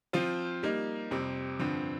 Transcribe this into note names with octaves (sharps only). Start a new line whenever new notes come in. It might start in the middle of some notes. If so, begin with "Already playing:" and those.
F3 C4 F4 C5
G3 A#3 D#4
F2 C3 G3 C4
G2 D3 F3 C4